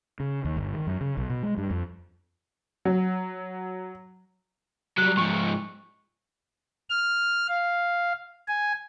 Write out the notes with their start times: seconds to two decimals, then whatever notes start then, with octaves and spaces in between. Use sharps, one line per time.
0.20 C#3
0.45 D#2
0.57 G1
0.74 D#3
0.87 F#2
1.01 C#3
1.17 B1
1.30 B2
1.43 G#3
1.58 G2
1.70 F2
2.85 F#3
4.98 F#3 G3 F#6
5.17 G#2 F3 C#6
6.90 F6
7.48 F5
8.48 G#5